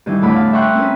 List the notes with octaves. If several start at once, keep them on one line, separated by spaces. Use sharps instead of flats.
G2 D#3 E3
E2 A2 D3 D5 A5 B5
F5
E5 G5 A#5 C6 C#6 F#6
C4 C#4 B4